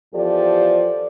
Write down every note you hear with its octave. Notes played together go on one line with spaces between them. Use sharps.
E2 F3 G4 A4 D5